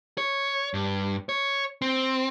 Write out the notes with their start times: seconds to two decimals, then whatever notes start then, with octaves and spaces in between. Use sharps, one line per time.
0.18 C#5
0.74 G2
1.29 C#5
1.82 C4